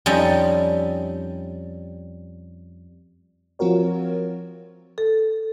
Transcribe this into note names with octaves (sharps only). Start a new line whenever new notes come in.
F2 G3 C#4 D#4
F3 C4 F4 F#4 A#4 C#5
A4